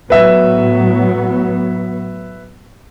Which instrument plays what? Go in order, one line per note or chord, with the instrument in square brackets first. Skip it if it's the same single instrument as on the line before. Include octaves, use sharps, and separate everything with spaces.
[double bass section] A2 F#3 B3 [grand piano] B4 E5 E6